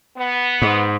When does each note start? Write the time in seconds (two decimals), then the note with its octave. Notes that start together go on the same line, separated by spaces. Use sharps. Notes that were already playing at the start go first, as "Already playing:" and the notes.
0.17 B3
0.62 G#2